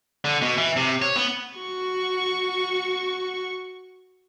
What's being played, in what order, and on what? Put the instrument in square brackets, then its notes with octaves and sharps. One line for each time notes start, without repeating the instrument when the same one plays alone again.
[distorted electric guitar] D3
B2
E3
C3
C#5
B3
[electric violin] F#4 C#6